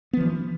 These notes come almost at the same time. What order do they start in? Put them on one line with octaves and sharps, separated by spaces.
B3 F3 E3